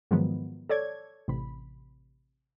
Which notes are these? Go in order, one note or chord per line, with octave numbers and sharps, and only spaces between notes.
G#2 D#3 F3 F#3 G#3 B3
A4 C#5 D5 G#6
A1 C3 B5